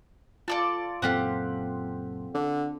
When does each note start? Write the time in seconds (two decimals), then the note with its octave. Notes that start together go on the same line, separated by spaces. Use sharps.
0.48 F4 A4 D5 A5
1.02 F#1 F#2 A#2 C4 F4 G4 A4 F#5
2.34 D3